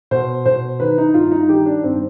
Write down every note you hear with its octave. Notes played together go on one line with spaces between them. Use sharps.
B2 C5
B2 C5
D#3 B4
D#4
G2 F4
D#4
D#3 G4
D4
G2 C4